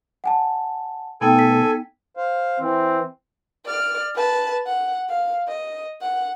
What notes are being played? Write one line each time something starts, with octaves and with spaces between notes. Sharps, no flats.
F#5 G#5 A5
B2 A3 B3 D#4 A4 G5 G#5
B6
C5 F5
E3 C4
D5 F6
B4 A5
F#5
F5
D#5
F#5